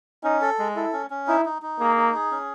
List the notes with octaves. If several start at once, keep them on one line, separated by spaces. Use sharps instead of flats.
C#4 D#4
A4
G#3
E4 A4
C#4
C#4
D#4 E4
D#4
D#4
A#3 G#4
D#4
G#4
C#4